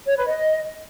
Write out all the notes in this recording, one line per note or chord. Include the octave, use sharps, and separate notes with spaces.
C#5
B4
D#5